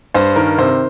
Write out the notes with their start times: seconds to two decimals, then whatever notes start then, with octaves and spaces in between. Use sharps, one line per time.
0.14 G2 C5
0.36 D#3 A#4
0.58 C3 C5